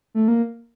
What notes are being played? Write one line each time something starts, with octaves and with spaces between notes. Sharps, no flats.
A3
A#3